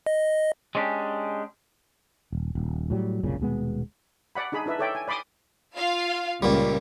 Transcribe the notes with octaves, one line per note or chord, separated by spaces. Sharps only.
D#5
G#3 C#4 D4 F#4 G4
D#1
D#1
A2 F#3 G3
F#1 C2 A#2 C#3
D#1 B2 G#3 B3
D5 F#5 B5
D4 D#4 G#4 B5
D4 E4 B4 E5
A4 C#5 D5 E5 G5
G#5
D5 B5 C6 D6 D#6
F4 F5
C#2 A#2 G3